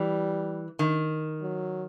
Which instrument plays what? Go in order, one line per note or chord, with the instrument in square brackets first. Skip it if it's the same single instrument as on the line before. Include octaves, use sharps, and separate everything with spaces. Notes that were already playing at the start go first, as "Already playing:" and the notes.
Already playing: [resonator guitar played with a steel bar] E3 [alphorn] G3
[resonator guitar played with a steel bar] D#3
[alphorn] F#3